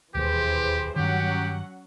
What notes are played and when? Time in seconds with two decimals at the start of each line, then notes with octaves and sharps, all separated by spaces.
0.15 E1 D#2 E3 G4 G#4 C5
0.96 G2 D#3 F#3 C#4 G4 F#5